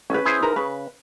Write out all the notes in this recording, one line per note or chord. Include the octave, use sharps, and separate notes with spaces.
A1 C#4 B4
E4 G#4 C5
D#4 A#4 B4
C#3 B4